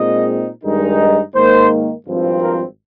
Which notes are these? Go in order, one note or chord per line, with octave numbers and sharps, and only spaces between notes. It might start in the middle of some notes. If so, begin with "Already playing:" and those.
Already playing: A#2 G#3 C4 D#4 D#5
G2 D#3 G#3 D#4
G#2 D#3 A#3 C5
G#1 G2 F3 C4
A#4